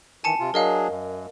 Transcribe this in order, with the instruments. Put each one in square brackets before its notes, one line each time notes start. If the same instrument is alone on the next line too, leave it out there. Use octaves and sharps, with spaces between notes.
[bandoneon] D#3 E3 [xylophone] G#5 A5 C#7
[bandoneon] C3 F4
[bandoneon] F#3 D4 G#4 [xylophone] A#4 D#5 F5
[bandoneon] F#2